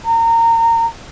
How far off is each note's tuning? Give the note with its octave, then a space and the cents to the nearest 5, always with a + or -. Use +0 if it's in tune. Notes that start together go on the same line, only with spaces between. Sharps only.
A#5 -25